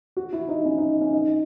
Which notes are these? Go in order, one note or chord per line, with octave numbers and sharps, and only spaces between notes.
F#4
E4
D#4
C#4
D#4
C#4
D#4